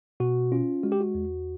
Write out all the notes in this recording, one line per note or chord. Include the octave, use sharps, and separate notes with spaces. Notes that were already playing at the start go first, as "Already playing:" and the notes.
B2 F#4
C#4 F4
G#3 F#4
G4
F#4
E2